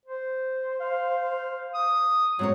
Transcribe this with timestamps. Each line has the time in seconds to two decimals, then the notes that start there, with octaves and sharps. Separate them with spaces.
0.06 C5
0.81 F5
1.75 D#6
2.39 G#2 F#3 C4 C#5